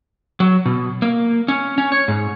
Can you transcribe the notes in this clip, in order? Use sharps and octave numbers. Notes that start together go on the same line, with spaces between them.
F#3
B2
A#3
C#4
C#4
C#5
G#2